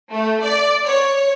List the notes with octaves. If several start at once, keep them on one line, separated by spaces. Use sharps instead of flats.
A3
D5
C#5